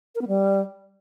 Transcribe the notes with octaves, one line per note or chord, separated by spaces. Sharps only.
A#4
B3
G3